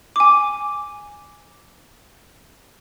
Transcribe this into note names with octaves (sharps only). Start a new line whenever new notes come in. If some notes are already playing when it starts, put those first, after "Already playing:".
G#5 D6